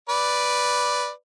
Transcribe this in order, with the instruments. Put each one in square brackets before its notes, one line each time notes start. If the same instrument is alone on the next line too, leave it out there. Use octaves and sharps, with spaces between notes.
[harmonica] B4 D5